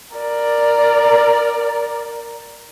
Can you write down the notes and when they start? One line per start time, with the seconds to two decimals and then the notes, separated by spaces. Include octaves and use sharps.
0.16 A#4 D5